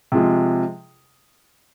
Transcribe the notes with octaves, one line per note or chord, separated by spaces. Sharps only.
C3 F3 G#3 F4 G#4